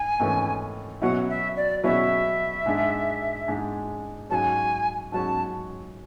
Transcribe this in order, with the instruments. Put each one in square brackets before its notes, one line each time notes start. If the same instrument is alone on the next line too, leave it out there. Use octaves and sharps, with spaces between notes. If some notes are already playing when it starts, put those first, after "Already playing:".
Already playing: [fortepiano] G#2 [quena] G#5
[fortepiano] G#1 G#2 E3 A3 C#4
[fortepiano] B2 F#3 C#4 E4 [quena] F#5
[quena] E5
D5
[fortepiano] B2 F#3 C#4 E4 [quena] E5
[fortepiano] G#2 G#3 D4
G#2 G#3 D4
[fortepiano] G#2 F#3 C#4 [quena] G#5 A5
[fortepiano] G#2 F#3 C#4 [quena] A5